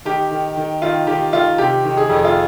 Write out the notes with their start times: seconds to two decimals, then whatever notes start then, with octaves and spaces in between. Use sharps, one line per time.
0.05 D#3 G4
0.31 D#3
0.57 D#3
0.82 D#3 F4
1.07 D#3 G4
1.33 D#3 F4
1.58 C3 G4
1.85 D#3
1.97 G#4
2.09 F2
2.25 F4